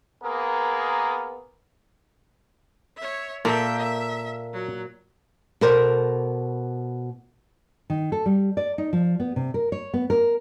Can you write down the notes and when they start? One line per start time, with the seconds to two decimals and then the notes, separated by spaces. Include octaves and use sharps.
0.24 A#3 B3 G#4 A#4
2.97 C#5 E5
3.45 A#2 A#3 A4 A#4 E5 G5
3.77 E5
4.53 F#3
5.61 B2 A4 A#4 C5 D5
7.90 D#3
8.12 A4
8.26 G3
8.57 D5
8.78 D#4
8.93 F3
9.20 B3
9.36 C3
9.54 A#4
9.72 C#5
9.94 B3
10.10 A#4